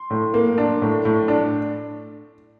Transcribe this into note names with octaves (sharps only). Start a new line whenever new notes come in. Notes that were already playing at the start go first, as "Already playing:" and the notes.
Already playing: C6
A2
A#3
D4
A2
A2
D4